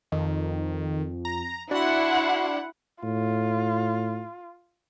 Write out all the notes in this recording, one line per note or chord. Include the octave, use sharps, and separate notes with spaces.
F2 D#3
A#5
D4 E4 F#4 F#5 C6
A2 F4